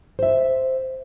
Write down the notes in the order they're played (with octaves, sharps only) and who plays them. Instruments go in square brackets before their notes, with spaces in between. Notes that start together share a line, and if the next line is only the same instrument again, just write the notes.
[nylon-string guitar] C5 E5